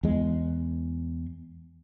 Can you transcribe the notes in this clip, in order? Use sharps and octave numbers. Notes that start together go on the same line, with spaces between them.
E2 G#3